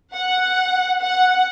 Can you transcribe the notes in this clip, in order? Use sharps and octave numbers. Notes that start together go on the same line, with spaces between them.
F#5
F#5